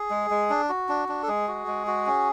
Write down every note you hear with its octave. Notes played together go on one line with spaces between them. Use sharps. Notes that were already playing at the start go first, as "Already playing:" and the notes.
Already playing: G#4
G#3
G#3
D4
F#4
D4
D4
A4
G#3 G#4
F#4
G#3
F#4
C#4